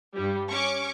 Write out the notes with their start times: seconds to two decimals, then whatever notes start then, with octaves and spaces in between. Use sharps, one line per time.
0.15 G2 G3
0.51 C#4 C#6 D6